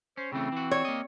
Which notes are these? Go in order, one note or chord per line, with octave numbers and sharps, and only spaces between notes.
C#4 C5
C#3 E3 A3 C4
E3 F#4
C#5
A#3 D#5